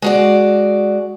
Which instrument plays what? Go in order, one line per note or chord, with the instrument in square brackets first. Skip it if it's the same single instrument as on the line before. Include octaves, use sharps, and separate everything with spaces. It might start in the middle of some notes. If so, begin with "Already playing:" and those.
[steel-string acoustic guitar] G#3 F#4 D5